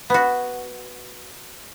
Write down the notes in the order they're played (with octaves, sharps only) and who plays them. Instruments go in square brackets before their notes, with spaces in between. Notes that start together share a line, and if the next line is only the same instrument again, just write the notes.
[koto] B3 F#4